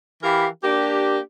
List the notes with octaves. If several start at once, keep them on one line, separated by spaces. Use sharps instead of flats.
E3 G4 A#4 F5 B5
A#3 D4 G4